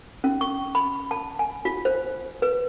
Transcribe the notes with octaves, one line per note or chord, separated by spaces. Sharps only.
C#4
C#6
B5
A5
G#5
F4
C5
B4